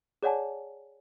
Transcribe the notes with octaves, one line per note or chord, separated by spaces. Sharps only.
G#4 C#5 D5 F#5 G#5 A5